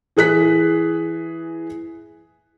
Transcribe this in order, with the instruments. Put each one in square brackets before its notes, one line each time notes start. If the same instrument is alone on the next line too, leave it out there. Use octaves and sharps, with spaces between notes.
[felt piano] E3 G#4 F#6 B6